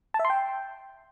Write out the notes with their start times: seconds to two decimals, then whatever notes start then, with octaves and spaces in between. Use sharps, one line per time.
0.14 A5
0.19 E5
0.25 C6
0.30 G5